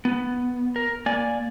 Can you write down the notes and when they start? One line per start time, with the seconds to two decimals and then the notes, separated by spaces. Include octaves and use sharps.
0.05 B3
0.76 A#4
1.06 A#3 D5 G#5